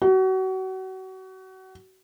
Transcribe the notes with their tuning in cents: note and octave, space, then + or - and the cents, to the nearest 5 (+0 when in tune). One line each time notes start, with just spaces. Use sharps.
F#4 +30